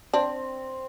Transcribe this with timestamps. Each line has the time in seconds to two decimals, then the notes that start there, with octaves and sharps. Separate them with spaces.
0.13 C4 D4